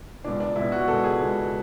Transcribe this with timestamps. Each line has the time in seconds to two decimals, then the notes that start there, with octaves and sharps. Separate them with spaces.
0.24 C#2 B2 D4
0.40 D4
0.56 C#2 B2 E4
0.72 F#4
0.88 C#2 B2 A4
1.04 G#4
1.20 C#2 B2